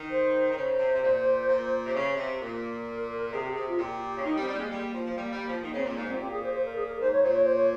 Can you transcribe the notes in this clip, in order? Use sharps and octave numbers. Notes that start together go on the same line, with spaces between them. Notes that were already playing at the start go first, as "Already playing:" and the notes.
Already playing: D#3
C5
D#3
C#3 C5
C3
C3
A#2
A#2
C3
C#3
C3
A#2 A#4
C3 G#4
G4
C3 G#4
F4
A#2 G4
C#3
D#3 D#4
G3
C4
G3
G#3 A#3
G3
F3
F3
G3
G3
F3
D#3 A#3
C#3 C4
A#2 A#3
G#2
A#2 C4
G4
G#4
C5
C5
A#4
G#4
A#4
G#2 C5
C#5
A#2 C5
C#5
C5
C#5